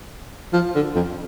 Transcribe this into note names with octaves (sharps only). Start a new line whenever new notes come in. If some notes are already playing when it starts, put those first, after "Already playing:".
F3
D3
F2